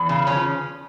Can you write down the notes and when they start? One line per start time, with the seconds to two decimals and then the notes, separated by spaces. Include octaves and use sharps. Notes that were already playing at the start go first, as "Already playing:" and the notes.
Already playing: E2
0.09 C#3
0.27 F3 C#4